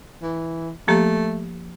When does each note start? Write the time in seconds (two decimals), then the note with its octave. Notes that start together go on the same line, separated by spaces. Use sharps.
0.22 E3
0.88 F3 A3 A#3 G4